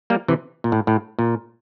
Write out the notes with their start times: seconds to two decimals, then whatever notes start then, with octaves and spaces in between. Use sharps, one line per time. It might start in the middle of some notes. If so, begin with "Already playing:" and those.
0.10 G3 A#3
0.28 C3 E3
0.64 A#2
0.72 A2
0.87 A2
1.19 A#2